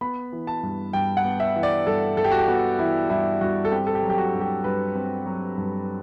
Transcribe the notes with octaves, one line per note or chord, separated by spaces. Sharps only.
B3 B5
E3
A5
G2
G2 G5
F#5
B3
E5
E3
D5
G2 A4
G2 A4
G4
F#4
G4
B3 F#4
E3 E4
G2 E4
G2 F#4
A4
C4 G4
A4
G4
F#3
G4
F#4
G2
G4
G2 B4
C4
F#3
G2